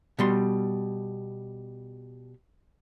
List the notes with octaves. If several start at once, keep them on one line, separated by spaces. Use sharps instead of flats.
B2 G3 C6